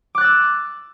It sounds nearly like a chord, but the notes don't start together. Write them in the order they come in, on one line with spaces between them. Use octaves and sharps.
D6 F#6 A6 E6